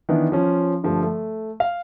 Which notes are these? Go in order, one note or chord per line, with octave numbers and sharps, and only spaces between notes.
D#3 E3 B3 D4 E4
F3 C#4 F4
G2 D3 F3 A3
A3
F5